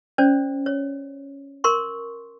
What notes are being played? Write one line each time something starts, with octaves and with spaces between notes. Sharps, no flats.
C#4 C5 D5
C#5
A#4 C6 C#6